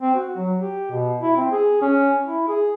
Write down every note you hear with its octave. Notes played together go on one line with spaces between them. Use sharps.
C4
F#4
F#3
G4
B2
E4
C4
G#4
C#4
E4
G#4